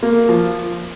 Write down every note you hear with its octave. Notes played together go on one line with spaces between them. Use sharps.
A#3
F3